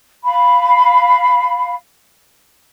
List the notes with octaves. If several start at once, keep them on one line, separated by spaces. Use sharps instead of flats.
F5 B5